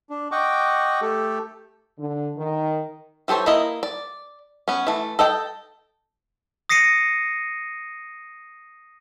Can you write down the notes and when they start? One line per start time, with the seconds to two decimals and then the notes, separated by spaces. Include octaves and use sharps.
0.10 D4
0.32 D#5 F#5 G5 C#6 D6
1.01 A3 G4 A4
1.98 D3
2.37 D#3
3.28 E3 G4 A4 C5 C#5
3.46 A#3 E4 D#5
3.83 D5
4.68 B3 C#4
4.87 E3 A3
5.19 A4 D#5 G5
6.69 D#6 A#6 C7 C#7 D#7